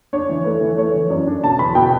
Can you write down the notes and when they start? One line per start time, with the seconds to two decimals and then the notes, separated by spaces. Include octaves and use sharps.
0.13 D4 C#5
0.29 E3
0.44 A3 B4
0.61 E3
0.77 A3 C#5
0.94 E3
1.10 F#2 D5
1.27 D4
1.43 B2 A5
1.59 E2 B5
1.75 B2 G5